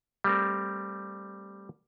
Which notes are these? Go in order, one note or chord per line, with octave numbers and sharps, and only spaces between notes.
G3 A3 C4 A#4